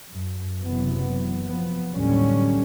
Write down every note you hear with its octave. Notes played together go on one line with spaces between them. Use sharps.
F#2
F#1 F#2 C3 E3 F#3 B3
F3 B3
D#2 A2 D3 F#3 G3 C#4